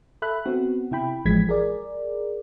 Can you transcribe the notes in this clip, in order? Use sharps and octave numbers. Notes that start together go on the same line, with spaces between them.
A4 E5 B5 F#6
B3 C4 F#4
C3 E4 G5 B5
A1 E3 F3 G#3 G#6 B6
G#4 A#4 D5